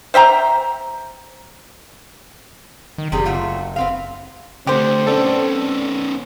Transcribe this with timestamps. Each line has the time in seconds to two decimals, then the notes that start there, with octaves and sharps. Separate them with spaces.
0.14 C5 E5 G5 A#5
2.98 D#3
3.12 F#1 C3 G3 G#4
3.25 A3 F4 F#4
3.76 B3 C4 F5
4.67 D3 A3 C4 G4 C5
5.07 B3 C#4 A4 D5